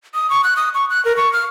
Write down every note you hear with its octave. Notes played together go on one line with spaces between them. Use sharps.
D#6
C#6
F#6
D#6
C#6
F#6
A#4
C#6
F6